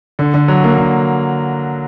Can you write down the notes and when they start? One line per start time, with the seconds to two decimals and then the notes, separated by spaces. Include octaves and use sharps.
0.19 D3
0.34 D3
0.48 F#3
0.64 A#3
0.78 D3